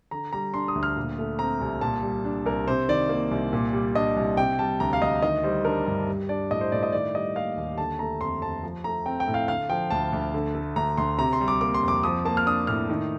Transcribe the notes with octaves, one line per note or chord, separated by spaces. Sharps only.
D3 A#5
G3 A#5
D4 C6
D#6
D2
F6
A#2
A3
C4 A#5
C2
A#2 A5
G3
D4
C2 A#4
C3 C5
D#3 D5
A#3
C2
A#2
G3
D4 D#5
C2
C3 G5
G3 A5
D2 A#5
F5
D2 D#5
D#3 D#5
G3 C5
D4 A#4
G2
G3
D4 D5
A2 D#5
C5
A2 D5
D#5
D#3 D5
G3 D#5
A#3 F5
D#2
D3 A5
A3 A#5
F2 C6
F2 A5
F3
A3 A#5
C4 G5
G5
A2
F5
D3 F5
F3 G5
D2 A5
D2
D3
A3
D2 A#5
D2 C6
C3 A#5
C6
G3
D6
A#3 D6
C6
F2 D6
F3 D#6
A#3 A5
F6
D4 D#6
A2 F6
D#3